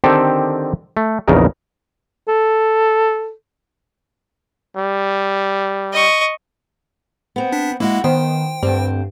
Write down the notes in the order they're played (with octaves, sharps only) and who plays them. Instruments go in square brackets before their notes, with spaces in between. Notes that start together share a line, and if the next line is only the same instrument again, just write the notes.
[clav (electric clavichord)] D3 D#3 C4 G4 A4 A5
A3
A#1 E2 C#3 D#4 A#4
[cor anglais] A4
[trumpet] G3
[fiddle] D#5 C#6
[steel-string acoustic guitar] B3 C4
[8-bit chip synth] D4 B6
[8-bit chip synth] G#3 A#3 [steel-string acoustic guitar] E4 F#4
[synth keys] D#3 B3 [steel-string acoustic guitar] C5 [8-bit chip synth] G5
[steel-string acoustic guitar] D2 C4 [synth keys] G2